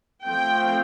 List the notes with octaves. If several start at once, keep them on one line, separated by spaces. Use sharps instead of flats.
F3 A3 C4 G5